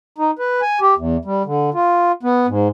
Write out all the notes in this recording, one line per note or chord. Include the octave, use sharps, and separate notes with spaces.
D#4
B4
G#5
G4
E2
G3
D3
F4
B3
G#2